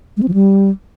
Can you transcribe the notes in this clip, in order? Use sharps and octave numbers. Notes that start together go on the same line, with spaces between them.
G#3
C4
F3
G3